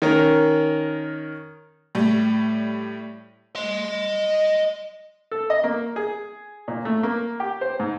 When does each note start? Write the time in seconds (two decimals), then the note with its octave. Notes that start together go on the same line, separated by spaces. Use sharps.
0.02 D#3 C#4 A#4
1.95 A2 G3
3.55 D#5 C6
5.31 A4
5.50 D#5
5.64 A#3
5.96 G#4
6.68 A#2
6.85 A3
7.03 A#3
7.40 G4
7.61 C5
7.80 G#2